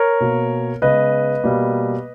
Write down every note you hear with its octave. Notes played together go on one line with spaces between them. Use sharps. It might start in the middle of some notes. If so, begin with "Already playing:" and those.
Already playing: A#4 C#5
B2 A#3
C#3 G#3 B3 B4 D#5
B2 G3 A#3